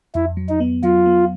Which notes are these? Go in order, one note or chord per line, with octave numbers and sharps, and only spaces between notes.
F2 E4
F#3
D#4
B3
F#3 F4
B3